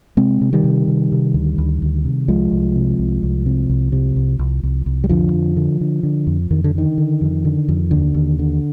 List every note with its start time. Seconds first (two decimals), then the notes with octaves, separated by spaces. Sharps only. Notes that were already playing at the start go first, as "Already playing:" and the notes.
0.17 C3 G#3 C4
0.41 C3
0.53 D#3 G3
0.64 C3
0.88 C3
1.12 C3
1.34 D2
1.58 D2
1.82 D2
2.05 C3
2.28 C2 F3 G#3
2.52 C2
2.76 C3
2.99 C2
3.23 C2
3.46 C3
3.70 C2
3.92 C3
4.16 C2
4.39 C2
4.63 C2
4.86 C2
5.04 G3
5.09 F2 D3 F3
5.33 F2
5.57 D3
5.81 D3
6.03 D3
6.27 F2
6.50 F2 D#3
6.64 D3
6.75 D3 D#3
6.98 D3
7.21 F2
7.45 D3
7.69 F2
7.91 D#2 D3
8.14 D#2
8.39 D3